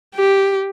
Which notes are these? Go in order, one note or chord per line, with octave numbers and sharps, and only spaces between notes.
G4